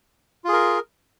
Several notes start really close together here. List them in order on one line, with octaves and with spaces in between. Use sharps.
F4 G#4 A#4